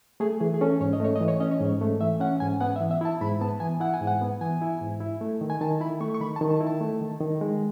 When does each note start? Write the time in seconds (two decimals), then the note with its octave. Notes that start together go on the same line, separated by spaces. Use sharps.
0.20 A3 G#4
0.40 E3 G#4
0.54 G#4
0.61 C#4 A4
0.81 G#2 C#5
0.93 D#5
1.00 A3 C#5
1.16 E3 D#5
1.28 C#5
1.40 C#4 D#5
1.51 C#5
1.61 G#2
1.81 A3
2.01 E3 E5
2.20 C#4 F#5
2.40 G#2 G#5
2.61 B3 F#5
2.76 E5
2.81 E3
2.91 E5
3.01 E4 A5
3.21 G#2 B5
3.41 B3 A5
3.60 E3 G#5
3.80 E4 F#5
3.94 G#5
4.01 G#2
4.07 F#5
4.21 B3
4.41 E3 G#5
4.62 E4
4.81 G#2
5.00 E4
5.21 A3
5.41 D#3
5.50 G#5
5.61 D#3 A5
5.80 E4 B5
6.01 A3 C#6
6.14 C#6
6.20 D#3 B5
6.36 A5
6.41 D#3
6.51 A5
6.61 E4
6.67 A5
6.81 A3
7.01 D#3
7.20 D#3
7.41 G#3